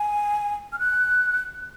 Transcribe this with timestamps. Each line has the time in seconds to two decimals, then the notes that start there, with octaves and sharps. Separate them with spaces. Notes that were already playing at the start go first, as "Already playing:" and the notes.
Already playing: G#5
0.73 F6
0.79 F#6